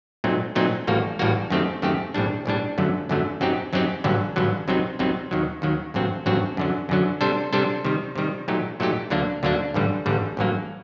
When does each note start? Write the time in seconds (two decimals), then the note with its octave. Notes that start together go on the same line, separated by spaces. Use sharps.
0.24 A#2 F#3 A3 C4 D#4
0.55 A#2 F#3 A3 C4 D#4
0.87 A1 A2 G3 A#3 F#4
1.19 A1 A2 G3 A#3 F#4
1.50 F#2 D#3 A3 C4 G4
1.82 F#2 D#3 A3 C4 G4
2.14 A#1 A2 G3 D4
2.46 A#1 A2 G3 D4
2.78 G1 F#2 D3 F#3 A3
3.09 G1 F#2 D3 F#3 A3
3.41 F#2 F#3 C4 D#4 G4
3.73 F#2 F#3 C4 D#4 G4
4.04 A1 G2 D3 F#3
4.36 A1 G2 D3 F#3
4.68 C2 C3 F#3 C4 D#4
4.99 C2 C3 F#3 C4 D#4
5.31 D#2 D#3 F#3
5.62 D#2 D#3 F#3
5.94 A1 G2 F#3 C4 F#4
6.26 A1 G2 F#3 C4 F#4
6.57 F#2 D3 F#3
6.89 F#2 D3 F#3
7.21 C3 G3 D4 A4 C5
7.53 C3 G3 D4 A4 C5
7.85 C3 D#3 G3
8.16 C3 D#3 G3
8.48 A#2 F#3 A3 D#4 G4
8.80 A#2 F#3 A3 D#4 G4
9.10 D2 D3 F#3 A#3 D4
9.43 D2 D3 F#3 A#3 D4
9.74 A1 G2 D3 G3
10.06 A1 G2 D3 G3
10.37 A1 G2 F#3 A#3